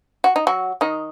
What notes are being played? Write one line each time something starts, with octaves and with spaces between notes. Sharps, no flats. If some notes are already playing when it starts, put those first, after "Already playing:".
F#4
D#4
F#3 F#4
D#3 D#4